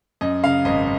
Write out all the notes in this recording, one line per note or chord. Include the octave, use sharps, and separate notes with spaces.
F#2 D#5
C#3 F5
G#1 D#5